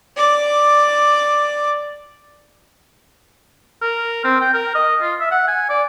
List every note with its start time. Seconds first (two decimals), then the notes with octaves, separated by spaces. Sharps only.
0.17 D5 D6
3.82 A#4
4.24 C4
4.41 G5
4.54 A#4
4.75 D#5
5.02 F4
5.20 E5
5.31 F#5
5.48 G#5
5.69 D5